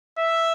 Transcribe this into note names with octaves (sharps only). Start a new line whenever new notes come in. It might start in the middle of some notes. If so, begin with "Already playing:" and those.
E5